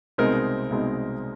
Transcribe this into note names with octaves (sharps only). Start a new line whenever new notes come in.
C2 B2 G#3 C4 D#4 A#4
C2 B2 G#3 C4 D#4